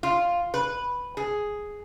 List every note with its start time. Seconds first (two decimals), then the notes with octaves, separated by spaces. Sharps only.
0.03 F4
0.54 B4
1.17 G#4